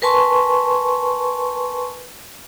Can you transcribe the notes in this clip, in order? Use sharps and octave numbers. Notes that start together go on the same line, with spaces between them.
A#4 B4 G#5 A5 C6 C#6